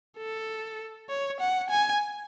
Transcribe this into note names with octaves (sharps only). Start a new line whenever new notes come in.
A4
C#5
F#5
G#5